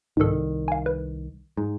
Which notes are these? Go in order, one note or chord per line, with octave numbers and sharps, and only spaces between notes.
C2 G#2 D#3 A4
F5 G#5
B4
G#2